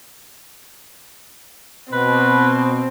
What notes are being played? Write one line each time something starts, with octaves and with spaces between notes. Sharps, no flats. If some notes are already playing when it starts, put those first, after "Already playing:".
B2 C4 B4